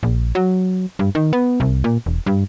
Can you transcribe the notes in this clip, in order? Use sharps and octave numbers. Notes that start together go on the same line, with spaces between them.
A#1
F#3
G2
D#3
B3
C2
A#2
E1
G2